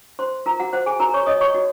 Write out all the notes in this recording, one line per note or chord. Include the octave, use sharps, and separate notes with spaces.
C5 C6
F4 A#4 A#5
F#4 F#5
F#4 C5 F#5
G#4 G#5
F#4 A#4 A#5
C#5 C#6
C#5 D#5 D#6
C#5 C#6
F#4